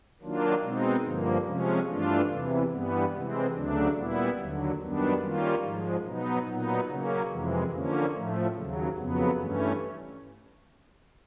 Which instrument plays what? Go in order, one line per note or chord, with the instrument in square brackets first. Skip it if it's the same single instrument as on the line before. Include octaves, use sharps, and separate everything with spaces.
[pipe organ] D#3 F#3 A#3 D4 F4
B2 G#3 C4 D#4
G2 D3 F3 A#3
C3 F3 G#3 C#4
G2 E3 A3 D4 F4
E2 C3 E3
G2 E3 G3 B3
C3 E3 G#3 C4
D2 C#3 F#3 A3 D4
A#2 G3 B3 E4
D#2 D3 F#3
F#2 D#3 G3 B3 D4
D#3 G3 A#3 C#4 F4
G#2 F3 G#3
B2 F#3 B3 D#4
A#2 F#3 B3 D#4
C#3 F#3 A#3 C#4
F2 C3 E3 G#3
D3 F3 A#3 C#4
A2 F3 A3
D#2 C#3 F#3
F2 C#3 F#3 B3
G2 E3 A3 C#4